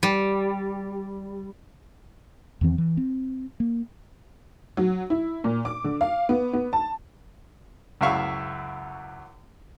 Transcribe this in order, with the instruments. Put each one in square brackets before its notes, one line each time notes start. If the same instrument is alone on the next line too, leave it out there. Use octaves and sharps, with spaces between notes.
[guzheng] G3
[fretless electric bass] E2 D#3 E3 C4
E3
C4
A#3
[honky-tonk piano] F#3
E4
A#2
D6
D3
F5
B3
B3
A5
[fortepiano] C#2 F#2 E4 E5 F5 C#6